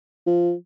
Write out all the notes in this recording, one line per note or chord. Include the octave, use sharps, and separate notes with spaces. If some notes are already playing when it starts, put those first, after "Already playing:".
F3